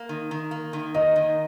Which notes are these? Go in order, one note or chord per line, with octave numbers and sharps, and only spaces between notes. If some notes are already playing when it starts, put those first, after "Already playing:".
Already playing: A#3
D#3
D#3
A#3
D#3
A#3 D#5
D#3